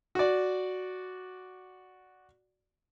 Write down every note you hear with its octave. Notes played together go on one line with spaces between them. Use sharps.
F#4 D5